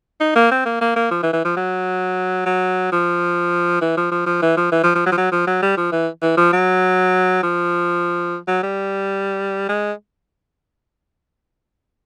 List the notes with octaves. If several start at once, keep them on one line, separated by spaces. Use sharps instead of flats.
D#4
A#3
C4
A#3
A#3
A#3
F3
E3
E3
F3
F#3
F#3
F3
E3
F3
F3
F3
E3
F3
E3
F3
F3
F#3
F3
F#3
F3
F#3
G3
F3
E3
E3
F3
F#3
F3
F#3
G3
G#3